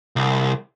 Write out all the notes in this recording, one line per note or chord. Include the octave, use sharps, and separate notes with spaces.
C2